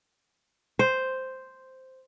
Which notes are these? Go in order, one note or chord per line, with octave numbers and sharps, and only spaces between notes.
C5